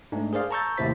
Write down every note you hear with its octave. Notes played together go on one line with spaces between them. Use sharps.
G#2 A3 D4
G#4 A#4 C5 D5 F5
A5 A#5 C#6 E6 G6 A6
D#2 A2 C3 E4 C5 B6